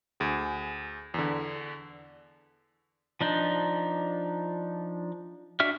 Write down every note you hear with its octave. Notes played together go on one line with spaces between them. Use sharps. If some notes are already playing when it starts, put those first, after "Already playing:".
D2 G#4
E2 D3
F3 D4 D#4
D4 F#4 E5 F6